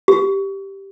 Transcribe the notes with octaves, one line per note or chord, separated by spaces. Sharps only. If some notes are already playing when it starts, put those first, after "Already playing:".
G4